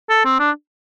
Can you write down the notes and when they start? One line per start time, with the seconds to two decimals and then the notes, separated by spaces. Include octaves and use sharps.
0.10 A4
0.25 C4
0.40 D4